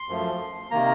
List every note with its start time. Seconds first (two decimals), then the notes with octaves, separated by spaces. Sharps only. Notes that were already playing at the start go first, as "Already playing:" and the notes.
Already playing: C6
0.09 F#2 F3 A3
0.71 C3 D#3 A#3 A#5